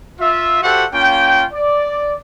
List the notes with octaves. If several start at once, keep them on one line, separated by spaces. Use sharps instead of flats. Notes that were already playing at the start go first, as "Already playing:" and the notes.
F4 E5
F#4 G4 A4 C5 E5 F#5
A#3 C#4 F4 G5
D5